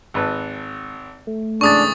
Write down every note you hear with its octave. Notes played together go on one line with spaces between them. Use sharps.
G#1 B4 A5
A3
G#2 C#3 E3 D4 C#6 D#6 A6